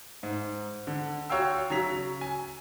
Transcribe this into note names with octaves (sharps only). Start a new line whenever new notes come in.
G#2
D3
F4 F#4 C#5 F5 G5 E6
C#3 F#3 C#5 A#5 B6 F7
G#5